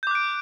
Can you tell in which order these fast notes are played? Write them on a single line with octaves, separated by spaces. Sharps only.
G6 D6 F#6 D7